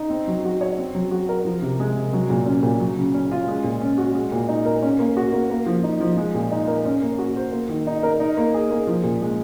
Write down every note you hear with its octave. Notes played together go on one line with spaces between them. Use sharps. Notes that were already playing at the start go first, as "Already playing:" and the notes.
Already playing: D#4
C4
F#3
F#4
C#5
C4
F#3
F#4
A#4
F3
C3
G#3
C3
F#3
A#2
C#4
A#2
F#3
C#3
C#4
F4
G#3
A#2
C#4
F#4
G#3
A#2
D#4
A#4
C#4
A#3
F#4
A#3
A#3
F3
D#4
F3
G#3
A#2
D#4
A#4
C#4
A#3
F#4
C5
A#3
D#3
D#4
A#4
D#4
A#3
G#4
A#3
F3
A#2
G#3